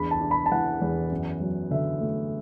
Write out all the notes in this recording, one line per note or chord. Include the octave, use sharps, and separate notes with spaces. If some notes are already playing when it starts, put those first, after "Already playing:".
Already playing: E2 D4 B5
A5
D4
B5
A5
E3 F#5
E2
F#2
F#3
D3 E5
A3